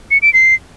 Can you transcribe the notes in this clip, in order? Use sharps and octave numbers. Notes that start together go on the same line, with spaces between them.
C#7
D7
C7